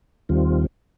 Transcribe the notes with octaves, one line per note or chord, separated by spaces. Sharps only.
D#2 D#3 G3 C4 F4